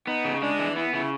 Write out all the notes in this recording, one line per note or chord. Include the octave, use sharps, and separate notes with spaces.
B3 D#4
C#3
G#3 D4
E3
B3 E4
C#3 E4